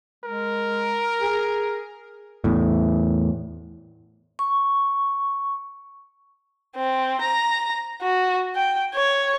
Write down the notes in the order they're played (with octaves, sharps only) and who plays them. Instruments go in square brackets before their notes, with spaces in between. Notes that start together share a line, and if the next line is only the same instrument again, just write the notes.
[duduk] G#3 [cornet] A#4
[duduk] G#4
[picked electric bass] E2 A2
[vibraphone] C#6
[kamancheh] C4
A#5
F#4
G5
C#5